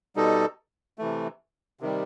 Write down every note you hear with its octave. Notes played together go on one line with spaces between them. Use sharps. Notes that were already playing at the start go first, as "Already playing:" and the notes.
B2 G3 D#4 A4
C3 E3 A3
C3 D#3 G3